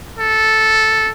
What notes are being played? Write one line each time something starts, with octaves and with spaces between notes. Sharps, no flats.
A4